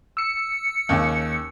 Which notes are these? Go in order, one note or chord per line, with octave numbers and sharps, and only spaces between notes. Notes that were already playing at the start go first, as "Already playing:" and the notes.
E6 C#7
D#2 C#3